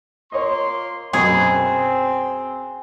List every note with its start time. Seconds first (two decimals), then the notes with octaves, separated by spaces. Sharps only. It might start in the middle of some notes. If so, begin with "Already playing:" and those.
0.32 A#3 F4 C#5 D#5 C6
1.13 F#2 B2 C4 G#4 C#6